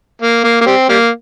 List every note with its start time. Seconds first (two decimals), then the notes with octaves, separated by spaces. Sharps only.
0.22 A#3
0.44 A#3
0.61 A#3
0.66 G3 C4
0.89 G3 A#3